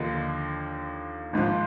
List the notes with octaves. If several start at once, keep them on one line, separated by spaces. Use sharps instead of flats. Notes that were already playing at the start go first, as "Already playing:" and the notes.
Already playing: D#2 D3 F3 A#3 D#4
G#1 G#2 F3